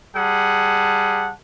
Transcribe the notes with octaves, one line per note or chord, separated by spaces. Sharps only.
G3 G#4 F#5 A5